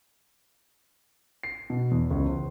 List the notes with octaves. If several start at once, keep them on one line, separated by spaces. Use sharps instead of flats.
C7
B2
E2
C#2
C5